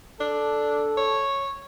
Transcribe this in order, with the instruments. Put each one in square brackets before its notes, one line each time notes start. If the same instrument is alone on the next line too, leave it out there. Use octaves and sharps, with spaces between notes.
[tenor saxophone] D4 [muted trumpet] A4
[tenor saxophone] C#5